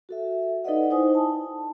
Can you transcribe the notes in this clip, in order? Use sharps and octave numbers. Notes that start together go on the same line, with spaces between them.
F#4 A4 E5
D#4 A4 B4 D5 D#5 F#5
D#4 E4 C5 G5 G#5 D#6
A5